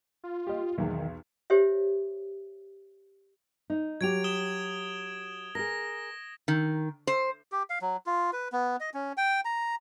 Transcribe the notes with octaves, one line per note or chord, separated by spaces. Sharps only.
F4
G4 D#5
B1 E2 D#3
G4 C5 C#5 E5
D#4
F#3 G4 G#6 D7 F7
D#6 E7 G7
G#4 A#4 A#6
D#3
C5
G4
F5
F#3
F4
B4
B3
D#5
C#4
G5
A#5